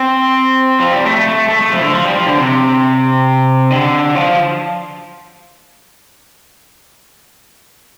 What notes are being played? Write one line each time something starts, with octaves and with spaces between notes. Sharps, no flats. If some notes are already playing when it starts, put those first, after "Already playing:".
Already playing: C4
F3
G3
A3
A3
A3
A3
F3
D3
F3
G3
F3
D3
C3
D3
F3